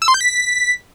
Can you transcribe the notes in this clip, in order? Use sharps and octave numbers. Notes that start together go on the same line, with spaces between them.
E6
C6
G6
B6